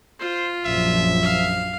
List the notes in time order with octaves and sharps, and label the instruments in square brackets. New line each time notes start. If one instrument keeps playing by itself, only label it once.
[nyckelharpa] F4 [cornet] C5
[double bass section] A#1 F#2 F3 [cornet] E5
[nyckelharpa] F5